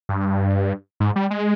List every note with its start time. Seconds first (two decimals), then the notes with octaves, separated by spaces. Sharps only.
0.09 G2
1.00 G#2
1.16 G3
1.31 G#3